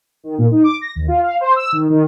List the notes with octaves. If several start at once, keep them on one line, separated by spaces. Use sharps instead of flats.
D#3
A#2
D#4
D6
A#6
D#2
F4
F5
C5
E6
D#3
D#3